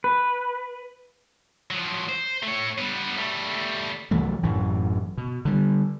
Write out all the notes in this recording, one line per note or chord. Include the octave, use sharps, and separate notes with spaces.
B4
F3 F#3
C5
A3 C#5
G3 B3
G3 A3
C2 E3 F#3 A3
A1 F#2 E3
B2
D3 G3